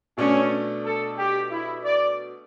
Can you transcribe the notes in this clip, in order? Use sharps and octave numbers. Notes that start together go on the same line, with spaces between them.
B2 A3 C#4 D4
A4
G4
E4
D5